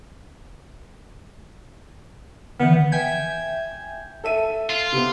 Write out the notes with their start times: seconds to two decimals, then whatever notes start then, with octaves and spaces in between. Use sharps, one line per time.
2.60 D3 E3 B3
2.92 E5 G5 G#5 G6 G#6
4.24 A4 E5 D#7
4.70 F4
4.92 C3 B3